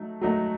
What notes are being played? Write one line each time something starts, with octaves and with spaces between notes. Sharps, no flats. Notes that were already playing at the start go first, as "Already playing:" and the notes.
Already playing: F#3 A3 D#4
F#3 A3 D#4